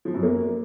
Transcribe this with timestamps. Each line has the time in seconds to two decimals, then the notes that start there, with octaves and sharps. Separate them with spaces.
0.05 F3
0.14 F#2
0.23 A#3